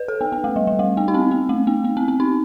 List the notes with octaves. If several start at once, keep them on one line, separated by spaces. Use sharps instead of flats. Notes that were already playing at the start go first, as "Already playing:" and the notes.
Already playing: B4
A4
B3
B3
A3
G3
G3
A3
B3
D#4
C4
B3
A3
B3
B3
C4
C4
D#4